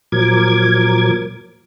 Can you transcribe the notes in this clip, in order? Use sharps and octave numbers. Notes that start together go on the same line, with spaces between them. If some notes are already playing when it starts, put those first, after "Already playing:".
A#2 F3 F#3 A#4 D6 G#6